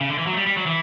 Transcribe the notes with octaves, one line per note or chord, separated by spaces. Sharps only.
C#3
D3
E3
F#3
A3
G3
G3
F#3
E3